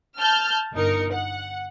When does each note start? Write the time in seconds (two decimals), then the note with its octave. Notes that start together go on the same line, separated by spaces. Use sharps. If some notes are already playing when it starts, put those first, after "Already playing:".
0.17 A5 F6 G6
0.73 G1 D#4 A#4 C#7
1.11 F#5